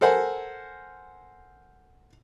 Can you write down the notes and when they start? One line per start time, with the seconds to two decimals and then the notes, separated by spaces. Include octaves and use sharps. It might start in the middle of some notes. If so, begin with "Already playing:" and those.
0.01 A4 A#4 C5 F#5 G#5